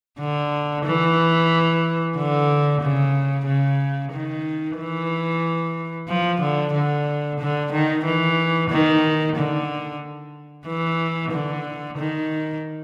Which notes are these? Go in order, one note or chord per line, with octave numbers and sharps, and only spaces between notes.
D3
E3
D3
C#3
C#3
D#3
E3
F3
D3
D3
D3
D#3
E3
D#3
D3
E3
D3
D#3